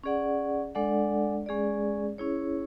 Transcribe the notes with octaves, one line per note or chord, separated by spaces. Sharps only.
C#4 G#4 D5 F#5
G#3 D4 A4 D5 F#5
G#3 C#4 G#4 D5
C#4 E4 G#4 C#5